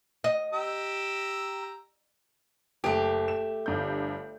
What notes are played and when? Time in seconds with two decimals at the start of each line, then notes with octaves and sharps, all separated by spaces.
0.24 D#5
0.53 G4 A#5 E6
2.84 F#1 A3 G4
3.28 E7
3.66 G1 G2 G6